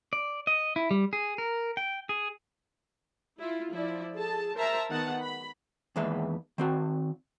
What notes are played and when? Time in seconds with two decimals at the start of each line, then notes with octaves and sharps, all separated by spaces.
0.13 D5
0.47 D#5
0.76 E4
0.91 G3
1.13 G#4
1.38 A#4
1.77 G5
2.09 G#4
3.41 E4 F4
3.72 F3 E4 D5
4.15 G#4 A4 A5
4.56 A#4 C5 E5 A5 A#5
4.90 D#3 B3 F#5 A5
5.21 B5
5.96 E2 D#3 G#3 A#3 B4 E5
6.58 D#3 C4 F#4